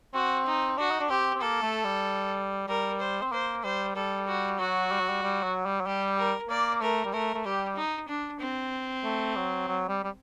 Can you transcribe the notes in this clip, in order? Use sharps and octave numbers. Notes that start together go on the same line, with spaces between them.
C4 F#4
D#4
D4 F#4
D#4
D4
C4 G4
C4
A#3 A4
A3
G3
G3 A#4
C5
C4
A#3 C5
G3 C5
G3 A4
F#4
F#3 F#4
G3
F#3
G3
G3
F#3
G3
F#3
G3 G4
A#4
A#3 D5
A3 A#4
G3
A3 A#4
A3
G3 G4
D#4
D4
C4
A3
F#3
F#3
G3
G3